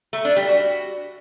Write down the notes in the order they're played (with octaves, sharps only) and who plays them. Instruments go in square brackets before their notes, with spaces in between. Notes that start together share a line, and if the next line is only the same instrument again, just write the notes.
[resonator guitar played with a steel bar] A3
D4
G3
F#4